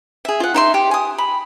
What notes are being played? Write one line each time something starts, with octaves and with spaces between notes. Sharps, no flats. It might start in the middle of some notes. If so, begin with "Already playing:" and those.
G#4 E5
F4 F#5
D#4 E5 C6
G4
G#5 D#6
B5